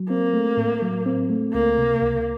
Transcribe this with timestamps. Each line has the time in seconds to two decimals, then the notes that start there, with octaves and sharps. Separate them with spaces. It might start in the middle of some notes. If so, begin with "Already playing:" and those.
Already playing: F#3
0.10 A#3 C4
0.33 A3
0.57 A2
0.82 F#3
1.06 C4
1.30 A3
1.54 C#2 A#3
1.78 C3
2.03 C#2